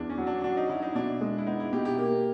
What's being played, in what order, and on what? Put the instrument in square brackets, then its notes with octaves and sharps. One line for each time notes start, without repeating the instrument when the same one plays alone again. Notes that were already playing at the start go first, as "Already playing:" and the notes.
Already playing: [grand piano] E2 [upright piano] D4
[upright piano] C#4
[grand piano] F#3
[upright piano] D4
[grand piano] F#3 [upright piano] D4
[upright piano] D#4
[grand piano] F#3 [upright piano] E4
[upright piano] D#4
[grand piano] B2 [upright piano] D4
[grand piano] G#3
[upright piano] E4
[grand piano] B3 [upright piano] D#4
[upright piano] E4
[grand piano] B2 [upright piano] G4
[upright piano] G4
[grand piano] A#3